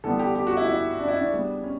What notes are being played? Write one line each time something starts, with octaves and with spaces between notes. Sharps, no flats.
E2 D3 G3 B3 A4
G4
G4
F#4
E4
E4
D4
E4
D4
C#3 G3 B3
C#4